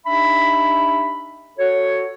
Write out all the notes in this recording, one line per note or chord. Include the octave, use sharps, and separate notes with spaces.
D4 D#4 G4 E5 B5
F#4 A4 C#5